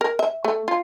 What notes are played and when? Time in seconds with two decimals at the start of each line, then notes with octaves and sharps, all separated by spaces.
0.01 A#4
0.19 E5
0.44 A3
0.68 F4